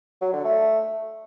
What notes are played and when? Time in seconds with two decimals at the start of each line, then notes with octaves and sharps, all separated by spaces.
0.21 F#3
0.33 D3
0.45 A3